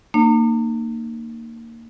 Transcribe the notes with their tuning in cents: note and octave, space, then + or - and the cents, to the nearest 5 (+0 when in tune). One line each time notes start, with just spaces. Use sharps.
A#3 -20 D#4 -45